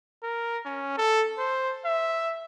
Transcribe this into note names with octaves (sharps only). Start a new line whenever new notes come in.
A#4
C#4
A4
C5
E5